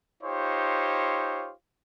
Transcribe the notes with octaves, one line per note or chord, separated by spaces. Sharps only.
D#4 F4 G4 C5 C#5